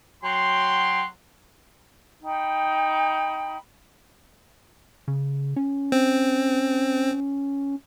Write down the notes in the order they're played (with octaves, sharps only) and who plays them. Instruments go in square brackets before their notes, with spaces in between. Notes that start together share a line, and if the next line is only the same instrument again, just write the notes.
[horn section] F#3 G5 C6
[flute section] D#4 G5 B5
[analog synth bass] C#3
C#4
[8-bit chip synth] C4